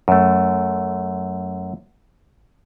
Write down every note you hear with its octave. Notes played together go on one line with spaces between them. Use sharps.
F#2 A3